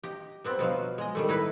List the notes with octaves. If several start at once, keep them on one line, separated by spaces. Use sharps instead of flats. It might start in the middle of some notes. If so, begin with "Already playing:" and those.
G4 D#5
G3 B3 C4
B2 F3 F#3 F5
G#3 D#5
D#3 G3 A3
A2 D#4 E4 B4